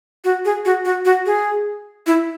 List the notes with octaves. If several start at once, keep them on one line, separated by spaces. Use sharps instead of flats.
F#4
G#4
F#4
F#4
F#4
G#4
E4